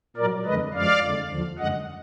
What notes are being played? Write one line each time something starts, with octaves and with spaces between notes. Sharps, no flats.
A#2 F#3 A#4 D5
F2 D3 G#3 B4 D#5
F#2 F3 G#3 D5 F5
F2 D3 G#3
D#2 D3 F3
F#2 D3 G#3 D#5 F#5